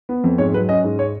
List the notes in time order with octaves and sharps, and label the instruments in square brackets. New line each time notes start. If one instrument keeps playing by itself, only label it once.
[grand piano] B3
F2
G#2 C#5
F#3 B4
C#4 D#5
G#2
C#5